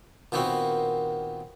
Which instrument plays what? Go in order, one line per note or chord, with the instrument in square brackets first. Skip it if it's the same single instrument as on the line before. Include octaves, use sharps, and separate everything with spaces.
[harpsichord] A#2 D#3 B3 C4 F#4